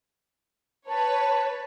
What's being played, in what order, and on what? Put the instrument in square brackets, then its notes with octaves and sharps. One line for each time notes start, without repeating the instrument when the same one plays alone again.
[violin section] B4 C#5 [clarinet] A5